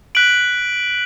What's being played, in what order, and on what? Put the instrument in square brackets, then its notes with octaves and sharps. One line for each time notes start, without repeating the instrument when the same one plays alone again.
[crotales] F#6 B6 D7 F#7